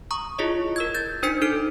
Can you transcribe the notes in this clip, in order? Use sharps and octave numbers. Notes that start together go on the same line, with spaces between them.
A#5 C#6 D#6
E4 F4 G#4 C#5 D#5
A#4 E6 G#6
G6 A6
D4 D#4 C5 G6 B6 C#7
D#4 A4 F6 D7